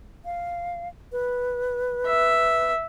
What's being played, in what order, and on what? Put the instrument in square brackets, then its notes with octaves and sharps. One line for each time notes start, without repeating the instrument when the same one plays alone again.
[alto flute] F5
B4
[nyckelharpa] E5